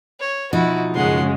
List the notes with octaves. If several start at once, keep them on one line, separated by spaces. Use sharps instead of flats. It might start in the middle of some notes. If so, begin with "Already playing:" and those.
C#5
B2 F3 D#4 E4 F#4
F#2 C#3 G#3 F#5 C6